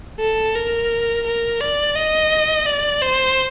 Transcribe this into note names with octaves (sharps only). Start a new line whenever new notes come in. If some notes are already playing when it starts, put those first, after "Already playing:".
A4
A#4
A#4
D5
D#5
D5
C5